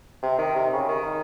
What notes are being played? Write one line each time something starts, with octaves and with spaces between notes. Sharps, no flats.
C3
D#3
C3
C#3
D#3